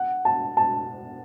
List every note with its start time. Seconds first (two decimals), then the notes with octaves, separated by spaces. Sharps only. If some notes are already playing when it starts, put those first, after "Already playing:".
Already playing: F#5
0.25 A5
0.57 A5